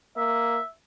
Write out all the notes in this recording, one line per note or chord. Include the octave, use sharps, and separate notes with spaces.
A#3 E5